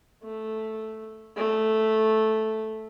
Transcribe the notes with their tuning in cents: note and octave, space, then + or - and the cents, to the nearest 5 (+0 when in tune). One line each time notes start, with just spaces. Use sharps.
A3 -5
A3 -5